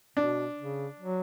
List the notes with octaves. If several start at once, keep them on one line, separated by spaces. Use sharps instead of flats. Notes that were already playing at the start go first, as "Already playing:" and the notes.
B2 D4
C#3
F#3